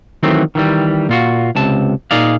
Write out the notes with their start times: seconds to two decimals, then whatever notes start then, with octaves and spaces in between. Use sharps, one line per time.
0.23 D#3 E3 F#3 A3 C4
0.55 D#3 E3 G3
1.09 A#2 F4 F#4
1.56 C#2 C3 A5
2.11 A#2 D#4 G#4 D5 F5